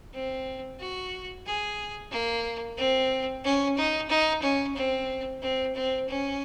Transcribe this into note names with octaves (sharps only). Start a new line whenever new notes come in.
C4
F#4
G#4
A#3
C4
C#4
D#4
D#4
C#4
C4
C4
C4
C#4